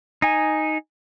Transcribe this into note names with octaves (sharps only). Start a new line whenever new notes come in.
D#4 G#5